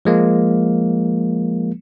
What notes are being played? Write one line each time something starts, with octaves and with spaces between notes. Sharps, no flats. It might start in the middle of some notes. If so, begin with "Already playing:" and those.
F3 G#3 A#3